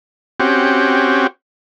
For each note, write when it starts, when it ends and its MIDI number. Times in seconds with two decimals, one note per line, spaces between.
0.40 1.27 60
0.40 1.27 61
0.40 1.27 66
0.40 1.27 67